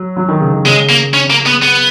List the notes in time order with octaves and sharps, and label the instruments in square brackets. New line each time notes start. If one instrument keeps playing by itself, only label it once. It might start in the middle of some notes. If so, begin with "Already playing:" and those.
Already playing: [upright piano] F#3
F#3
D#3
C#3
D#3
[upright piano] C#3 [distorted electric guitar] G#3
[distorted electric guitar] A#3
C#4
A#3
B3
B3